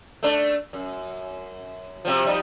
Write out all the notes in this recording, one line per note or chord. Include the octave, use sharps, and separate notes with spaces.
A3 D4
F#2
C3 F3
F3 G3 D#4